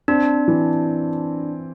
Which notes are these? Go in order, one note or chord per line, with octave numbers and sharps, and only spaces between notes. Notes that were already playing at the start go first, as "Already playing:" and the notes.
C4 D4
E3